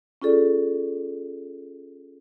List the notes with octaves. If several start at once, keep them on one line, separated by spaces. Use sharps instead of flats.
C#4 F4 G#4 A4 D5